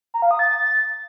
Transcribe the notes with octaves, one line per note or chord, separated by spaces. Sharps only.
A#5
F5
D#6
A6